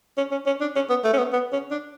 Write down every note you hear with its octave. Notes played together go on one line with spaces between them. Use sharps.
C#4
C#4
C#4
D4
C#4
B3
A3
C#4
B3
B3
C#4
D4